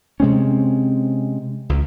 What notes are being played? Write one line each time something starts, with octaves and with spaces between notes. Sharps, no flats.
C3 G#3 C4 C#4
C#2